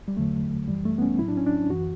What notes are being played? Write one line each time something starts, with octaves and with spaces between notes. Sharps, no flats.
G3
E2 D3 F#3 A3
F#2 E3 G3
A3
B3
C#4
A2 F#3 E4
D4
C#4
D4
F#2 E3 F#4